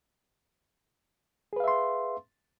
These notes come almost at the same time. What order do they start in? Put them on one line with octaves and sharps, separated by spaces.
G#4 B4 F5 E5 C6